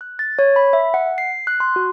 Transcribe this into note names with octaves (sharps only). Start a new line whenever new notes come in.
F#6
A6
C#5
B5
E5
F#5
C7
F#6
C6
F#4